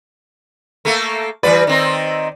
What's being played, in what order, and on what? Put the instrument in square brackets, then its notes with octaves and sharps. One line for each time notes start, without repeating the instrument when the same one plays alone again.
[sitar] A3 A#3 A4
[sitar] E3 G3 B4 [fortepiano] D5
[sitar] D#3 C4 D#4